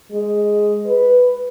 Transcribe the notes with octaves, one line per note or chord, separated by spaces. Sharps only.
G#3
B4